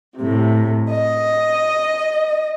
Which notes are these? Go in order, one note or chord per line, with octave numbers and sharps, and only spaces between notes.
A2 C3
D#5